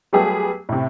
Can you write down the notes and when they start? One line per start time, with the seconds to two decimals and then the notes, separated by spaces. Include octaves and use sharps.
0.13 F#3 G3 A3 B3 G4 G#4
0.69 A2 C3